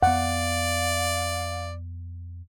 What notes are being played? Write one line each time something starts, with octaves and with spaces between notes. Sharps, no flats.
F2 B3 D5 F5 F#5